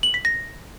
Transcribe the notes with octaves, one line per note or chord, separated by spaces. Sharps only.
F#7
B6
A#6